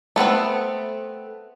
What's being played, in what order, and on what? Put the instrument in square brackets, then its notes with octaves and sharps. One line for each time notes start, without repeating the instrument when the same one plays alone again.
[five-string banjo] A3 B3 C4 B4